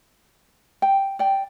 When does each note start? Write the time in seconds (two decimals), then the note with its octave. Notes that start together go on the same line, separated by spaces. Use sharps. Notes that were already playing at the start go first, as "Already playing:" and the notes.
0.82 G5
1.19 D5 G5